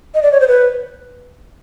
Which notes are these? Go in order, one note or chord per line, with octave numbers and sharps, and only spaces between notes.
D#5
D5
C#5
C5
B4